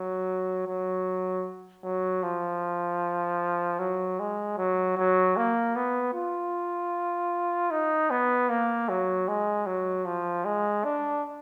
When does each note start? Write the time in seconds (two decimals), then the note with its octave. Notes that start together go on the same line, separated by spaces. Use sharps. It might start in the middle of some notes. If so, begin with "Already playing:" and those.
Already playing: F#3
0.67 F#3
1.84 F#3
2.23 F3
3.79 F#3
4.20 G#3
4.58 F#3
4.98 F#3
5.37 A#3
5.76 B3
6.14 F4
7.71 D#4
8.11 B3
8.50 A#3
8.89 F#3
9.28 G#3
9.67 F#3
10.06 F3
10.45 G#3
10.84 D4